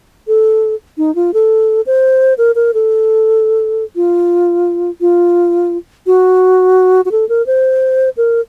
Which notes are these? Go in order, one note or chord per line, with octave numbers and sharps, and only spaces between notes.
A4
D#4
F4
A4
C5
A#4
A#4
A4
F4
F4
F#4
F#4
A4
A#4
C5
A#4